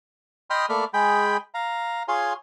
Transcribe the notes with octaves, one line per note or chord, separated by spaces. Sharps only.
D#5 G5 B5 C6 D#6 F6
A3 A#3 A4 D5 B5 F6
G#3 G#4 G5 B5
F5 A#5
F4 G#4 C#5 F5 G#5 C6